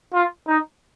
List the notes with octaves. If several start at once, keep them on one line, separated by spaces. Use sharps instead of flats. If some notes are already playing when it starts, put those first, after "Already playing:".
F4
D#4